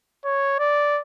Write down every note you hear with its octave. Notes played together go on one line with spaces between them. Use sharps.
C#5
D5